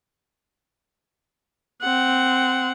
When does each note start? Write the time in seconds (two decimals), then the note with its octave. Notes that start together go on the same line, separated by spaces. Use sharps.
1.82 C4 F#5